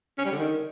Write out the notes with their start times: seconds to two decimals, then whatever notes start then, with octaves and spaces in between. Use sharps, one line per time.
0.18 C#4
0.25 G3
0.32 D3
0.39 D#3